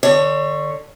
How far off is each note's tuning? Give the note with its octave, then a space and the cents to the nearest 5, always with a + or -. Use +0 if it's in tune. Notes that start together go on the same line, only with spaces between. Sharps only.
D3 +30 C#5 +0